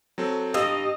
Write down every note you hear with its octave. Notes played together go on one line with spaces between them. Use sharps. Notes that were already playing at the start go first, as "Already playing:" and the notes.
F#3 C4 A4
G2 A#3 D#5 F5 D#6 E6